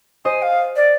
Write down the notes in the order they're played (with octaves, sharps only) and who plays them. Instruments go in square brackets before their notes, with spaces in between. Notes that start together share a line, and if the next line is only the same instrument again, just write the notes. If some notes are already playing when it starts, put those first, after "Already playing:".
[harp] C5 D#5 [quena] G#5
[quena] F5
D5